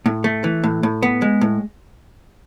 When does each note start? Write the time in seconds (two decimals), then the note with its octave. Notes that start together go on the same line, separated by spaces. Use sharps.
0.06 A2
0.24 A3
0.44 E3
0.64 A2
0.83 A2
1.02 B3
1.22 G#3
1.41 A2